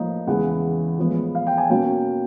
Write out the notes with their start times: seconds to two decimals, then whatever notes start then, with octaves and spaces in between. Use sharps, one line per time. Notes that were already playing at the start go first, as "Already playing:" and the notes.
Already playing: A2 F3 A#3 D#4
0.27 E2 C#3 E3 G#3 F#5
0.98 A2 F3 G#3 B3
1.35 F5
1.47 G5
1.57 G#5
1.69 B2 F#3 A#3 C#4 G5